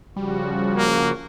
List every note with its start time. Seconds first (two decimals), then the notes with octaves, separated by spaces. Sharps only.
0.16 C#3 F3 G3 F#4
0.76 A#3